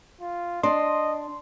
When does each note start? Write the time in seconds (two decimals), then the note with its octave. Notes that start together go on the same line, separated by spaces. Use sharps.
0.21 F4
0.63 D4 D#5 C6